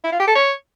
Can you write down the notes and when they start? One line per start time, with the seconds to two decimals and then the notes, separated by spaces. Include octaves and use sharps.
0.04 E4
0.12 F4
0.20 G4
0.27 A4
0.35 C#5